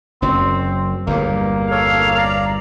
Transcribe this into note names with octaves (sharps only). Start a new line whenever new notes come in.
F#1 F#2 F#3 C4
G1 E2 G2 A#3
A4 A#4 C#5 F5
D5 A#5